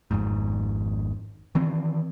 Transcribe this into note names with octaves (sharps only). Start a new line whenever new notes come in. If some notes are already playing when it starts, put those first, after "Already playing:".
G#1 F2 G#2
D#3 E3 C4